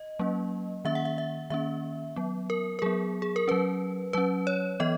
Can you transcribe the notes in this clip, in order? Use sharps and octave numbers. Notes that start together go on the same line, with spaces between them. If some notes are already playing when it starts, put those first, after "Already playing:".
Already playing: D#5
F#3 A#3 C#4
D#3 A#3 C#4 E5
F#5
E5
E5
D#3 A#3 C#4 E5
F#3 B3
A#4
A#4
F#3 B3 G#4
G#4
A#4
F#3 C#4 B4
F#3 C#4 B4
C#5
E3 B3 D#5